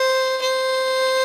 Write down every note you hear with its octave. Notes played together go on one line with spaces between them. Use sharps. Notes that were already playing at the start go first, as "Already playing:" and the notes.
Already playing: C5
C5